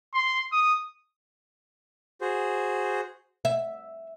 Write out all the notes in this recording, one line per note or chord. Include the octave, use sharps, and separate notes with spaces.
C6
D#6
F#4 G#4 C5
E5